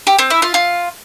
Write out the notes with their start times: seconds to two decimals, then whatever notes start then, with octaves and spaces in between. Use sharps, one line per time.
0.07 G4
0.19 C4
0.30 E4
0.42 F4
0.54 F4